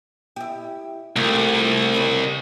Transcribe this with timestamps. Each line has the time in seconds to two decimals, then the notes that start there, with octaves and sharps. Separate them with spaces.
0.36 E4 G4
1.16 C2 A3 F4 G4
1.94 E2 C#3 C#5